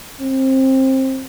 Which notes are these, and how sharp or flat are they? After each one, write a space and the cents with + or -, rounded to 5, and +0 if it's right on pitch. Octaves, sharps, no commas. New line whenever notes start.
C4 +20